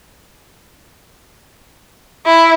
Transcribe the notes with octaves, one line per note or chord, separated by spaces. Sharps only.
E4